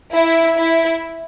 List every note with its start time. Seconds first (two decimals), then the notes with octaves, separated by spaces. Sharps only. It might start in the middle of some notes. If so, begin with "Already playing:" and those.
0.14 E4
0.57 E4